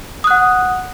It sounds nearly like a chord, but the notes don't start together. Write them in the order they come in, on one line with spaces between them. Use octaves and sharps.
D#6 F#6 F#5